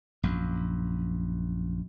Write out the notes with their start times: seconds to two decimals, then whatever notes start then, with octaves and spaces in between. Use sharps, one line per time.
0.23 A#1 F#2